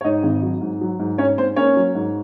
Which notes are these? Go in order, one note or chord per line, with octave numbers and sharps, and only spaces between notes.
C#5
G#2 D#4 D#5
G#1
F#3
G#2
F#3
G#2
G#2 C#4 C#5
G#2 C4 C5
A#3 C#4 C#5
F#3
G#2